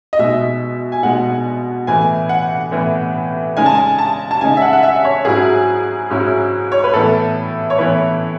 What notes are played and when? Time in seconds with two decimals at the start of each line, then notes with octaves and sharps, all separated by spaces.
0.13 D#5
0.19 B2 G#3 D#4 E5
0.92 G#5
1.03 B2 G#3 D#4 F#5
1.87 A2 E3 B3 G#5
2.29 F#5
2.72 A2 E3 B3
3.57 C#3 G#3 D#4 G#5
3.66 A5
3.75 G#5
3.99 A5
4.31 A5
4.41 C#3 G#3 D#4 G#5
4.57 E5
4.62 F#5
4.73 F#5
4.83 E5
5.04 C#5
5.25 G#2 F#3 C#4 E4 G#4
6.10 G#2 F#3 C#4 E4
6.72 C#5
6.84 B4
6.94 A2 E3 B3 E4 A4
7.70 C#5
7.78 A2 E3 B3 E4 B4